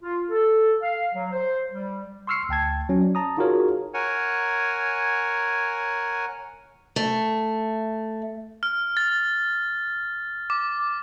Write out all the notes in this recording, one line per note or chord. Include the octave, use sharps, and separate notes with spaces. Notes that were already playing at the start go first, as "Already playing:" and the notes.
F4
A4
F5
F#3
C5
G3
C6 C#6 E6 F6 C7 C#7
D2 G5 A5 G#6
F#3 C#4
D5
A5 A#5 D#6
D#4 F4 F#4 G#4 A#4 C#5
A#4 C#5 F#5 G#5
A3
F6
A6
D6